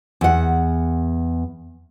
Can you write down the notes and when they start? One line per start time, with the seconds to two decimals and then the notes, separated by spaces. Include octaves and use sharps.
0.21 E2 F#5